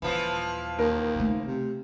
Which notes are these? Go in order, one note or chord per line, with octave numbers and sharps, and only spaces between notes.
D#1 E3 F3
D#2 A#4
C#3 A3
C3